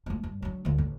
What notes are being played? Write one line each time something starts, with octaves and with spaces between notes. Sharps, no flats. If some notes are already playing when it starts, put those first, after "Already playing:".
F3 A3
G2
F#3 D4
D2 F3
A1